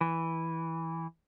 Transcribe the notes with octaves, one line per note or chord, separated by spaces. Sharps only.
E3